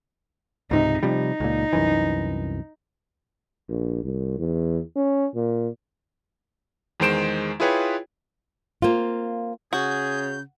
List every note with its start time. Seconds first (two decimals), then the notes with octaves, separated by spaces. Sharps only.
0.71 C#2 G#2 C3 D#4
1.03 C3 F3 G3 D#4
1.40 C#2 A#2
1.73 C2 F#2 E3
3.69 A#1
4.04 C2
4.39 E2
4.96 C#4
5.35 A#2
7.00 E2 D#3 G#3 C5 D7 E7
7.60 E4 F4 G#4 B4 C#5 G5
8.82 A#3 C4 F4
9.73 C#3 F#4 G#4 G6